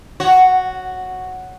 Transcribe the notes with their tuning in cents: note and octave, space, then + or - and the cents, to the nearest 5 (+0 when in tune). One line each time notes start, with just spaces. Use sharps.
F#4 +0 C#5 +0